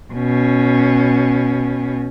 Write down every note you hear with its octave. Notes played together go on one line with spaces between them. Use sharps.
B2 C#4